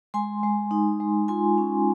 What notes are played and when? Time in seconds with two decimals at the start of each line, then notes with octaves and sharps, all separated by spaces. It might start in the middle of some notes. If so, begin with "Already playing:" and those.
0.14 G#3 G#5 C6
0.43 G#3
0.71 D#4
1.00 G#3
1.28 F4 G#5 C6
1.58 C#4